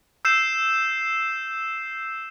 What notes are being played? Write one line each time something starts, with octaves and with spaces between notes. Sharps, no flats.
E6 G6 C7 E7